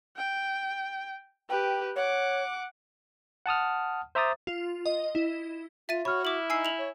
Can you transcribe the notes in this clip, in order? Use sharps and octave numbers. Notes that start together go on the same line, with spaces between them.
G5
G4 B4 G5
C#5 F#5 D6
F#5 A5 D#6 F6
C5 E5 A#5 D6 D#6 A6
F4
D#5
E4
F4 E5 A6 D#7
F#4 C#5 B5 C#6 F6
E4 D6 F#7
D#4 G#5 E6 C7
F7 F#7
C#5